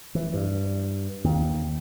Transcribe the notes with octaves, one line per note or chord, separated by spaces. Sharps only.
E3
G2
D#2